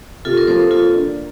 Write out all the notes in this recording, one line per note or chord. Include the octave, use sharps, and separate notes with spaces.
C3 F4 A4
A#4
F3 A4 C5
A#3 F4 A4
D4